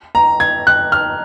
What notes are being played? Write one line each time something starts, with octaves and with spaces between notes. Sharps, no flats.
A#5
G#6
F#6
F6